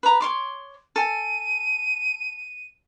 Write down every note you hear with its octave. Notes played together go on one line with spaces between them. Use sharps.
B4 A#5
C#5 C6 D6
A4 G#5 D#7